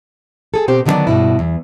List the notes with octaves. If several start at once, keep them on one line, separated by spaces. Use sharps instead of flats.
G#4 A4
B2 C4 G4 C5
D3 D#3 F#3 G3 B3 D4
G2 B2 E4
E2